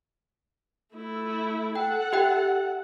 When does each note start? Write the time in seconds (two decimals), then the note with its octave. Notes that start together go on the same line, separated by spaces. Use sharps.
0.95 A3 E4
1.76 A4 F#5 G5
2.13 G4 E5 G5